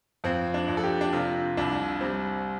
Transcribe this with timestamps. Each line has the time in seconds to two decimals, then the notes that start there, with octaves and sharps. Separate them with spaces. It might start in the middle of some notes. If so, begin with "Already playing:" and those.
0.24 F2 C4
0.54 D4
0.68 F2
0.77 A4
0.83 G4
1.01 D4
1.13 C3 F4
1.57 C2 D4
2.01 G3 C4